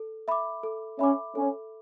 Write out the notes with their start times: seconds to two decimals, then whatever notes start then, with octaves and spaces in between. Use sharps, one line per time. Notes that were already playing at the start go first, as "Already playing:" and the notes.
Already playing: A4
0.28 E5 B5 D6
0.63 A4
0.99 C#4 E5 B5 D6
1.35 C#4 A4